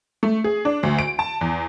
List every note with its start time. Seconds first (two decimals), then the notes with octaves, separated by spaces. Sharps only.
0.23 A3
0.44 G#4
0.65 D4
0.83 D2
0.99 D7
1.19 A5
1.41 E2